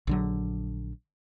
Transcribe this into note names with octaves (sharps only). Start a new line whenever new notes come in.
A#1 D3 F#3